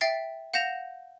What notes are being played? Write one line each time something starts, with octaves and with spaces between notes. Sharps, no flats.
E5 G5 A6 C7
F5 F#5 G6 A#6 E7 F7